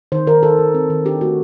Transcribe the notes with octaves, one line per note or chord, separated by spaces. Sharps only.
D#3 C5
D#3 A#4
D#3 A4
D#3
C4
D#3
D4 G4
A3 F#4